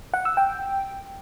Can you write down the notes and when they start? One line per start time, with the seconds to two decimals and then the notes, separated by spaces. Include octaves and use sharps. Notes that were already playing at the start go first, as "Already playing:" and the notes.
0.14 F#5
0.25 E6
0.37 G5